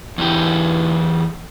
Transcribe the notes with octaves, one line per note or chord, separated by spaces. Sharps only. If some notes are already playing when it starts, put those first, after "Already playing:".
E2 E3 G4